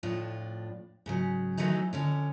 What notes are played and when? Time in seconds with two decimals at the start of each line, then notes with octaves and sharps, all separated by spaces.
0.03 F2 A2 D4 F4
1.06 G#2 C#3 F#3
1.57 E3 F#3 A3 C4 D#4
1.93 F2 D3 C#4